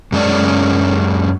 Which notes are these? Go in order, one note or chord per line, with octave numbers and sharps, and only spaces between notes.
F#2 G#3 C#4 D5